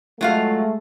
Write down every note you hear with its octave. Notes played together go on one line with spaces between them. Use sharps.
F#3 G#3 A3 F4 F5